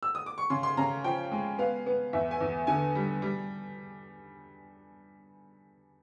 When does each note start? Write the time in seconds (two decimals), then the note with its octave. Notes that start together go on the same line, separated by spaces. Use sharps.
0.03 E6
0.15 D#6
0.26 D6
0.38 C#6
0.50 C#3 C6
0.63 C6
0.77 C#3 A#5
1.04 F3 G5
1.32 G#3
1.59 B3 F5
1.86 B3
2.13 E2 E5
2.31 G#5
2.41 E2
2.67 D3 G#5
2.95 G3
3.22 G3